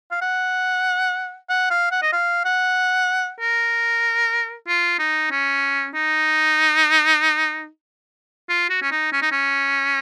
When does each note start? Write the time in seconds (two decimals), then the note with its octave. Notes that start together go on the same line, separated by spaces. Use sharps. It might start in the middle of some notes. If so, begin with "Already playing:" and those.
0.11 F5
0.22 F#5
1.49 F#5
1.71 F5
1.91 F#5
2.02 D#5
2.13 F5
2.45 F#5
3.40 A#4
4.67 F4
4.99 D#4
5.31 C#4
5.95 D#4
8.49 F4
8.70 F#4
8.82 C#4
8.91 D#4
9.12 C#4
9.22 D#4
9.32 C#4